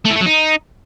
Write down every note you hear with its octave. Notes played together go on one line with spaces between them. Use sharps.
A3
E3
A3
F#3
D#4